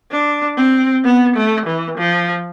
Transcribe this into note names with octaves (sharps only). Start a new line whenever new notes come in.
D4
C4
B3
A3
E3
F3